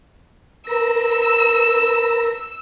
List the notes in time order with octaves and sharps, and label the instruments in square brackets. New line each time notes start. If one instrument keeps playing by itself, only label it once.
[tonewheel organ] A#4 B4 A#5 [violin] E6